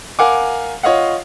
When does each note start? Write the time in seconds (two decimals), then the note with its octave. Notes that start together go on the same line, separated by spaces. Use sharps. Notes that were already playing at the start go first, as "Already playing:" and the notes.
0.19 A#4 F5 F#5 G#5 D6
0.83 F4 C#5 D#5 F5 F#5